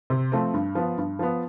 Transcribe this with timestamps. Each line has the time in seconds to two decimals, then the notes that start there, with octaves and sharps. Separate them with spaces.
0.10 C3
0.32 F3 A3 C4
0.54 G2
0.75 F3 B3
0.98 G2
1.19 F3 B3